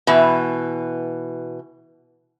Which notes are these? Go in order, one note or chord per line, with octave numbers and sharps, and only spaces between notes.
B2 E3